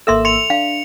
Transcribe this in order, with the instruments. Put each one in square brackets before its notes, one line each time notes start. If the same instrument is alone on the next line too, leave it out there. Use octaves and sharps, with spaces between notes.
[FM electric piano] G#1 A#3 E6 [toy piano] A4 E5 C6
[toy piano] C6 [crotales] C#7 F7
[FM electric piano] D4 [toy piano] F5